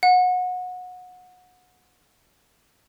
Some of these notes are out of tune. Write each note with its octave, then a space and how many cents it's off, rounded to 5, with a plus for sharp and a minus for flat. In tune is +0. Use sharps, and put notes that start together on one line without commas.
F#5 -25